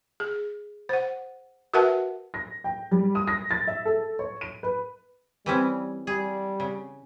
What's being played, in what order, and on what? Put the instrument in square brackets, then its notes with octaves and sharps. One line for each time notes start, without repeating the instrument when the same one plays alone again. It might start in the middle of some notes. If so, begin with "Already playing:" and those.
[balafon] G#4
C5 F#5
F#4 A#4 B4 E5 F#5 A5
[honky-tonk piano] A#6
G5
G3
D#6
A#6
A6
E5
A4
C#5
D#7
B4
[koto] E3 C4 C#4 [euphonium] G3
[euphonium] G3 [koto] G#4
[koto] C#3